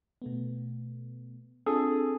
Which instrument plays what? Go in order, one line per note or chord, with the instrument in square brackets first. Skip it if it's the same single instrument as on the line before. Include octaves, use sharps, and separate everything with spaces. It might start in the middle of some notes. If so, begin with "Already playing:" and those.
[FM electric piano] B2 A3 B3
[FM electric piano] C4 D4 F4 [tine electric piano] G#4 A4